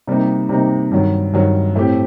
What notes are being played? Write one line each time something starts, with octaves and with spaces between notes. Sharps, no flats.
C3 G3 A#3 D#4
C3 G3 A#3 D#4
G2 D#3 F#3
G2 D#3 F#3
A2 A3 C4 G4